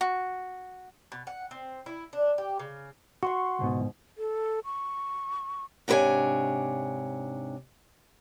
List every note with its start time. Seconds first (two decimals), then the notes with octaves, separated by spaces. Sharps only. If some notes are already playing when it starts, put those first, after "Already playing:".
0.01 F#4
1.12 B2
1.27 F#5
1.51 C4
1.86 E4
2.13 D4
2.38 G4
2.59 C#3
3.23 F#4 F#5 C6 C#6
3.59 C#2 G#2 B2
4.18 A4
4.65 C#6
5.88 G#2 C3 D4 B4 C#5 G#5